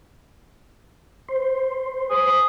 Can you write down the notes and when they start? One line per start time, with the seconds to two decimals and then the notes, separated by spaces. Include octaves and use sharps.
1.29 C5
2.11 G#4